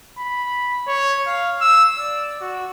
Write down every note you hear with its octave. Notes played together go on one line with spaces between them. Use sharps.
B5
C#5
F5
E6
D5
F#4